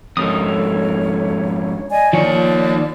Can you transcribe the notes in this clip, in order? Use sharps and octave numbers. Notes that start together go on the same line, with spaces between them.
F2 G#2 A4 A#4 C#5 D#6
D5 D#5 G#5
D#3 F3 A#3 C#5 D5